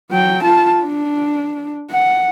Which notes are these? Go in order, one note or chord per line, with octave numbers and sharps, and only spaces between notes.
F#3 G5
F4 A5
D4
F#5